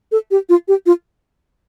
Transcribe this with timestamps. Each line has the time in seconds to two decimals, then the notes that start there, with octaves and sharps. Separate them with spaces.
0.12 A4
0.31 G4
0.49 F4
0.68 G4
0.86 F4